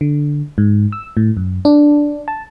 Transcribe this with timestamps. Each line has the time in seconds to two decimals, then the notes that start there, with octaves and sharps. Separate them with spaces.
0.01 D3
0.58 G#2
0.92 E6
1.17 A2
1.37 F#2
1.65 D4
2.28 A5